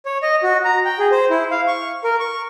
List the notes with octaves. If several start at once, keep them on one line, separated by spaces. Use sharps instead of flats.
C#5
D#5
F#4
A#5
G5
G#4
C5
E4
F5
C#6
A#4
C#6